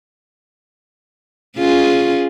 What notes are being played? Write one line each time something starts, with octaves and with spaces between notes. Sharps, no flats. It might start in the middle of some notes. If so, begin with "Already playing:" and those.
C#4 F4 G#4